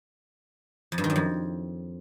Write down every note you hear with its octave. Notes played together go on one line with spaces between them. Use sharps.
F2
G2
D#3
F#2
F2